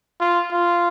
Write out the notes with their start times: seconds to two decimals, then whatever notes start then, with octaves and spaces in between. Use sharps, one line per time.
0.20 F4
0.51 F4